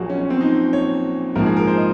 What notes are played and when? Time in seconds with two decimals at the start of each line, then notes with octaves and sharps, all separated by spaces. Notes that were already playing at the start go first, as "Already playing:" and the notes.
Already playing: A#1 A#2 F#3 A#3 F#4 G#4
0.10 C#4
0.20 C#4
0.30 C4
0.41 D#4
0.73 C#5
1.35 A#1 G#2 F3 A#3 A#4
1.46 G#4
1.57 A#4
1.67 C5
1.77 D#5